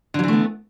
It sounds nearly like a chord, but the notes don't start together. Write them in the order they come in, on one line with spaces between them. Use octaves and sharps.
D3 F#3 E3 A3 B3